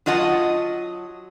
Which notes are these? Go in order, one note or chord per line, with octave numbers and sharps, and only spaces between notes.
F#3 F4 D#5 F#5 A5